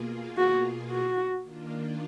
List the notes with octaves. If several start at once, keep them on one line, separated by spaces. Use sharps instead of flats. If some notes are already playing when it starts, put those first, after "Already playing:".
Already playing: B2 A#3 F4 G#4
F#4
F#4
D#3 A#3 D4 F4